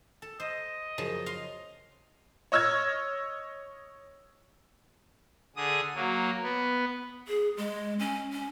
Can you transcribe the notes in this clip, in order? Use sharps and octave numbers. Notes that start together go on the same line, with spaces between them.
A4
C5 D#5
F#2 C#3 F3
F5 C6
C#5 D#5 E6 F6 G#6
D3 G#4 D#6
F#3 A#3
B3
G#4
G#3
C#4
C#4